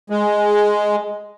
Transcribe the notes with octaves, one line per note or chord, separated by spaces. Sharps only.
G#3